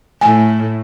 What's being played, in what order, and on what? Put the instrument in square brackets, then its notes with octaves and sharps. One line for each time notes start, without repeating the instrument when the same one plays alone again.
[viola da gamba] A2 [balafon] G#5